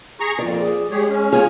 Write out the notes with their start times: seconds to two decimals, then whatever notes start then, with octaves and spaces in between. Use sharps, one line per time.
0.20 G#4 A#5 C#6
0.39 F2 A#2 D5
0.58 G#4
0.91 G#3 G4 G#4 C#5
1.09 C#4
1.32 F4 G#4 C#5